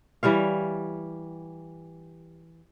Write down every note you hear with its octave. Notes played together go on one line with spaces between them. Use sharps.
E3 G3 C#5 F5